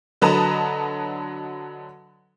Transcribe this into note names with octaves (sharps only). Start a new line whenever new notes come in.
D3 F#3 B4 D#5 A5 A#5